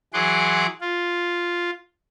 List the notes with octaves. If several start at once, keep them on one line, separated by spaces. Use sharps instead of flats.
E3 F#3 G#4 F#5 C6 D6
F4